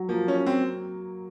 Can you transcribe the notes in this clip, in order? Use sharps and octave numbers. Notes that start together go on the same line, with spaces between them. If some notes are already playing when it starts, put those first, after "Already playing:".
Already playing: F#3
F3 A#3
C#4
C4